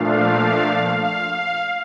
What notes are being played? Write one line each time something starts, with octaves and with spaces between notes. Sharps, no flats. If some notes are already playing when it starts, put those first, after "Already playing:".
Already playing: A#2 F3 A3 D4 F5
F5
F5